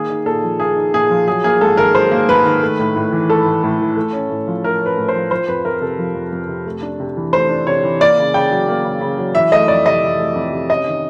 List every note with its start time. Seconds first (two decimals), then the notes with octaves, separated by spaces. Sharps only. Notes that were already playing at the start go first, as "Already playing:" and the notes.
Already playing: D#3 A#3 G#4
0.10 D#4
0.26 A#2 A4
0.44 F3
0.60 A#3 G#4
0.76 D#4
0.94 A#2 G#4
1.11 F3
1.27 F#3 G#4
1.44 A#3 G#4
1.61 G#2 A4
1.77 D#3 A#4
1.95 F#3 C5
2.12 A#3
2.28 G#2 B4
2.45 D#3
2.62 A3
2.79 A2
2.96 A2
3.12 E3
3.30 A3 A4
3.45 A2
3.63 A2
3.80 E3
3.97 A3
4.13 C#4
4.30 A2
4.48 F3
4.64 A3 A#4
4.80 C#4
4.86 B4
4.98 A2
5.08 C5
5.15 F3
5.31 F3 C5
5.48 F2 B4
5.65 F2 A#4
5.81 C3 A4
5.99 F3
6.15 F2
6.32 F2
6.49 C3
6.66 A3
6.82 D4
7.00 C3
7.17 E3
7.33 A3 C5
7.49 D4
7.67 C3 C#5
7.84 E3
8.00 A#3 D5
8.18 C#3
8.34 C#3 G5
8.51 F#3
8.68 A#3
8.84 C#3
9.01 C#3
9.18 F#3
9.35 E3 E5
9.52 A3 D#5
9.68 F2 D5
9.85 C3 D#5
10.02 E3
10.19 A3
10.35 F2
10.53 C3
10.70 C#4 D#5
10.87 D#3